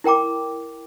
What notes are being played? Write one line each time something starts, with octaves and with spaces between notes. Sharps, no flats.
E4 A#4 G5 A#5 D6